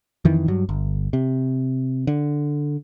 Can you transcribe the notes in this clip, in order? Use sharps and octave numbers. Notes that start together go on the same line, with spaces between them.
F2 D#3 E3
G2 F#3
G1
C3
D3